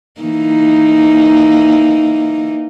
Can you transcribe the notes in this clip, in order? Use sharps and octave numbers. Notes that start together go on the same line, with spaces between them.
E3 A#3 D#4